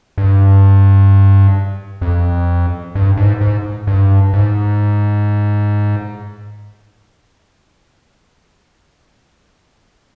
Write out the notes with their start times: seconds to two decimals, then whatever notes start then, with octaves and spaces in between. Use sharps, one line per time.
0.18 G2
2.02 F2
2.95 G2
3.17 G#2
3.41 G#2
3.87 G2
4.34 G#2